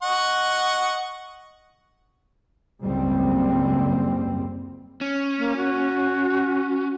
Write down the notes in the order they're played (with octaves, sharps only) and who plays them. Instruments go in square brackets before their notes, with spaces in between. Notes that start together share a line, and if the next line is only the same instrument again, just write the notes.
[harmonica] D#5 F#5 C#6
[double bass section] F#1 C#2 G#2 G3 C4
[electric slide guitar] C#4
[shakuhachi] A#3
F#4